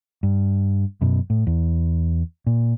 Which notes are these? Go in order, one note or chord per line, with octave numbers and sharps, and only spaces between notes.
G2
F#2 B2
A2
E2
A#2